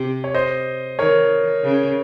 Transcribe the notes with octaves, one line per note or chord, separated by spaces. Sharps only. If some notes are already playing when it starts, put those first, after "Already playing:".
Already playing: C3
C#5
C5 D#5
D#3 A#4 C#5
C#3